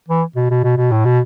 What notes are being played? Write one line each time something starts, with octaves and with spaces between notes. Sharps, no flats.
E3
B2
B2
B2
B2
A2
B2